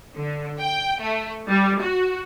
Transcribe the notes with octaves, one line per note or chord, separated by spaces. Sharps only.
D3
G5
A3
G3
F#4